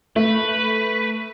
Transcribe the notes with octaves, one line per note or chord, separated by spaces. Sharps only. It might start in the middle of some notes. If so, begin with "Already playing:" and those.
A3 B4